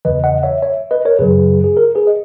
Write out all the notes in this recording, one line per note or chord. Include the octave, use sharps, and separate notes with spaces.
E2 C#3 E3 B4 D#5
D#5 F#5
C#5 E5
C#5 E5
B4 D#5
A#4 C#5
F#2 C#3 F#3 G#4 B4
G#4
A#4
G#4 B4
D#5